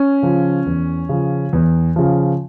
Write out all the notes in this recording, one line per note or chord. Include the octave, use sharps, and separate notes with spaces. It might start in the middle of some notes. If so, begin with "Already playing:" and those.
Already playing: C#4
C#3 F3
E2
C#3 F3
E2
C#3 F3